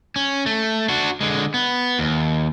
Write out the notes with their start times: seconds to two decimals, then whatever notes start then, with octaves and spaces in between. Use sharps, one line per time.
0.16 C#4
0.46 A3
0.88 D4 F#4
1.21 D3 G#3
1.54 B3
1.99 D#2